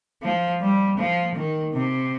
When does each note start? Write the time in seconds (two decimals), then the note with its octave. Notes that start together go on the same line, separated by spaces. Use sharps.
0.23 F3
0.61 G3
0.98 F3
1.36 D#3
1.73 C3